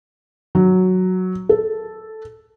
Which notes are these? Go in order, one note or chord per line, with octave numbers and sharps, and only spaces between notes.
F#3
A4